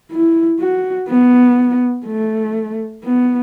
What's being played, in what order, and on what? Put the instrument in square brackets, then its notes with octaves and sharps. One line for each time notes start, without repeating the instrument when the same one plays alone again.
[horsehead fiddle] E4
F#4
B3
A3
B3